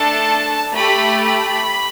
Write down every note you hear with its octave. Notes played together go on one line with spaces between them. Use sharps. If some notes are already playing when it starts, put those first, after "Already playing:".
Already playing: A3 D4 A4 A5
A3 G4 B5
B5